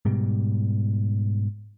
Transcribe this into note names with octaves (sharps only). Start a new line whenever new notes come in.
G#2 B2 G3